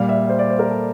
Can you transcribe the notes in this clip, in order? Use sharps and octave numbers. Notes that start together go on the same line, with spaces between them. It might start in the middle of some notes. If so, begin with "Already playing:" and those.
Already playing: A#2 G3 F5
E5
C5
D5
C5
A#4
A4